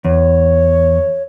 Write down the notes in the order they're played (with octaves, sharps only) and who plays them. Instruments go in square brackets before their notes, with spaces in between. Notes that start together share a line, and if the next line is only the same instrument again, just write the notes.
[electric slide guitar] E2 [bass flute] C#5